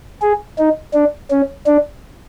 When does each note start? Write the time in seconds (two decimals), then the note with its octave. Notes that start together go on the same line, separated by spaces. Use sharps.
0.22 G#4
0.58 D#4
0.94 D4
1.31 C#4
1.66 D4